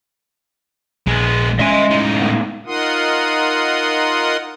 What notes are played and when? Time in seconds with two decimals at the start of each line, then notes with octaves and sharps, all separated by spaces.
1.07 A#1 G#3 B3
1.60 G#3 C#4 D#5 E5 G#5 C6
1.91 A2 D#4
2.18 A3 B3
2.66 D#4 F4 A#4 F#5 C6 D#6